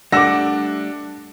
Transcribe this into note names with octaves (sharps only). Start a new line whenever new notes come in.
G3 A3 D4 F#5 D6 E6 A#6 E7